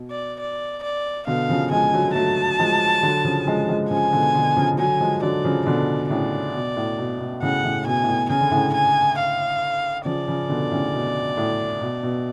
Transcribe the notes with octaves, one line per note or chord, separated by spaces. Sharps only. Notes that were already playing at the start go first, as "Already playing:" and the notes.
Already playing: B2
D5
D5
D5
B2 D3 F5
C#3 F3
F3 G#3 G#5
D3 F#3
F#3 A3 A5
F3 G#3
D3 F#3
C#3 F3
F3 G#3
F3 G#3
C#3 F3 G#5
B2 D3
B2 D3
C#3 F3
D3 F#3 G#5
F3 G#3
D3 F#3 D5
C#3 F3
B2 D3 D5
A2 C#3 D5
B2
A2
B2
B2
A2 C#3 F#5
A2 C#3
B2 G#5
A2
B2
C#3 G#5
D3
A2 C#3
G#5
F5
C#3 F3 D5
C#3 F3
B2 D3
A2 C#3
B2
A2
B2
B2